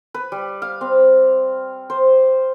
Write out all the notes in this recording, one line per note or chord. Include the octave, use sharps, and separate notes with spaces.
B4
G3
F5
C4
C5